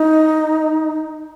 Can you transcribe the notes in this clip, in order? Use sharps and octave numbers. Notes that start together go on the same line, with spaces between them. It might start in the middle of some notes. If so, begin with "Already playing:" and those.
Already playing: D#4